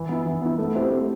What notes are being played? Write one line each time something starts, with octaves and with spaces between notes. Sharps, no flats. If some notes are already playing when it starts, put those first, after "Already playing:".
Already playing: E3
B3 E4
E3
B3 E4
A3
C4 E4 G4 C5
A3